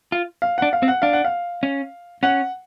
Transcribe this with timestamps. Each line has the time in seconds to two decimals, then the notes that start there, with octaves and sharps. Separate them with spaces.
0.12 F4
0.42 F5
0.58 D4 F#5
0.73 F5
0.83 C4
0.88 F#5
1.02 D4 F5
1.13 F#5
1.24 F5
1.63 C#4
2.23 C#4 F#5